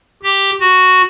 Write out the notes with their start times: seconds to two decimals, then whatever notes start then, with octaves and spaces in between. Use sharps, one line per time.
0.23 G4
0.60 F#4